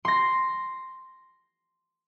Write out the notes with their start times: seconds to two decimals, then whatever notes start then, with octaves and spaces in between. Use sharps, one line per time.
0.05 C6 A#6